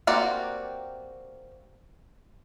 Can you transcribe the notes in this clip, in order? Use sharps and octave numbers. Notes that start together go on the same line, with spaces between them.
A#3 C4 F#4 G4 D5